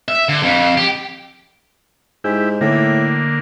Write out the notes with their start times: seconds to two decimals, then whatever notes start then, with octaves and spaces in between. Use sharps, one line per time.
0.08 E5
0.29 D3
0.43 F2
0.77 G4
2.24 G#2 E4 G4
2.61 A2 D3 A#3